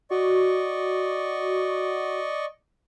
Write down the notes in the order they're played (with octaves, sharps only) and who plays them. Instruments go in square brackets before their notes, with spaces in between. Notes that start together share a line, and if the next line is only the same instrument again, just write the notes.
[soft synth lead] F#4 [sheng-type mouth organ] D5 D#5 C#6